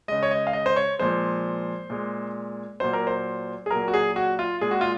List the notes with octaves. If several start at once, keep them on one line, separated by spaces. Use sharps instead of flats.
C#3 G#3 D#5
C#5
D#5
F5
D#5
C5
C#5
A#2 F3 G#3 C5
A#2 G#3
A#2 F#3 C5
A#4
C5
G#4
A#2 F#3 A#4
F#4
G#4
F#4
F4
A#2 G#3 G#4
F#4
F4